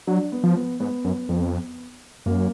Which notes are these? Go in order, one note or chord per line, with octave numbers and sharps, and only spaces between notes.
F#3 D4
B3
F3
B3
G#2 B3
F#2
F2
F#2 A#3